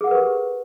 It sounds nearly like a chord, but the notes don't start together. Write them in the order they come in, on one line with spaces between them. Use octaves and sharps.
G#4 F#5 A#4 B4 G4